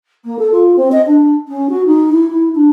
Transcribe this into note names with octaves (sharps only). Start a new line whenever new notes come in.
A#3
A4
F4
C4
D#5
D4
C#4
F#4
D#4
E4
E4
D4